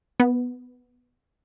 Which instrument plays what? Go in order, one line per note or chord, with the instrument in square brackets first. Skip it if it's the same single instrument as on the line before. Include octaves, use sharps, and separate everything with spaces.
[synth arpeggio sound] B3